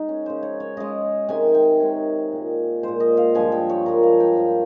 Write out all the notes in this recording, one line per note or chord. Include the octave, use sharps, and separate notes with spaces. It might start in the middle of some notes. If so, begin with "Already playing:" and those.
Already playing: G#3 D#4
C#4
C#3 G#3 C5
C#5
C#5
C#3 G#3 D#5
C3 D#3 G#3 G#5
G5
C3 D#3 G#3 C#5
A#2 G#3
A#2 G#3 C5
D#5
F5
G2 F3 G#3 G#5
G5
C#5
G2 F3 G#3 A#4
F5
G5
G2 F3 A#3 F5